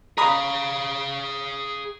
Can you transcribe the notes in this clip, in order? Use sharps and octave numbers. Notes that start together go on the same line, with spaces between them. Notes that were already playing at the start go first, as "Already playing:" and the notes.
G#4 F5 A#5 B5 D#6